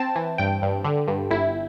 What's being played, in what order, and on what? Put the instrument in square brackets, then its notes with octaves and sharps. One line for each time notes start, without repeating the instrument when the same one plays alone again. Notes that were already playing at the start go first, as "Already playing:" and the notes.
Already playing: [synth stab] C4 A5
E3
G2 G5
G2
D3
G2
G1 E4